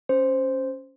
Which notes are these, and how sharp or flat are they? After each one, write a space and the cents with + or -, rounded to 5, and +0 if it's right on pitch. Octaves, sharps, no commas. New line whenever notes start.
C#4 +0 C5 +0